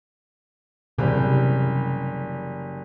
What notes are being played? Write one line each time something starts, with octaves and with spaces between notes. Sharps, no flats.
F#1 C3 E3 G3